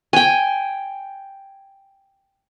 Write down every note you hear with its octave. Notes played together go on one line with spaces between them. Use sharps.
G5 G#5